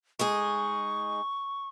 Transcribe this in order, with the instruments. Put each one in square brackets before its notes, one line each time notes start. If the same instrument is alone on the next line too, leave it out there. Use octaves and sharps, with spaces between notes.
[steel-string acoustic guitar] G#3 D#4 G#4 [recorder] C#6